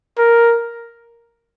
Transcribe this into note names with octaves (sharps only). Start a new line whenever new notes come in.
A#4